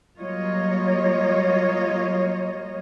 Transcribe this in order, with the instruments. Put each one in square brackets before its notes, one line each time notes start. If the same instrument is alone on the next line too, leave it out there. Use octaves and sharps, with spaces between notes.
[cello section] F#3 G3 A#3 F4 C#5 D#5